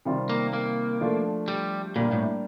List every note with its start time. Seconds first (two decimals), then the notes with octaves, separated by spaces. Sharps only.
0.05 C3 D#3 G3 C4 F4
0.29 A#3
0.53 A#3
1.01 F3 A3 D4 F4
1.48 G3
1.96 A#2 G3 A#3 D4
2.12 A2